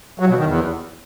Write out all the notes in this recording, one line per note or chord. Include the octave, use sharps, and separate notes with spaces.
F#3
B2
D#3
E2